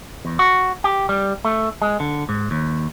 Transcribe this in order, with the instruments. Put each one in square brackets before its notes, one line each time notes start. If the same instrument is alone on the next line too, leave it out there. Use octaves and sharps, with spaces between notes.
[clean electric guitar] E2
F#4
G4
G3
A3
G#3
D3
G#2
D#2